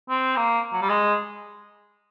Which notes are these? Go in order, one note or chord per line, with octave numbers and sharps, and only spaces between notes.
C4
A#3
F#3
G3
G#3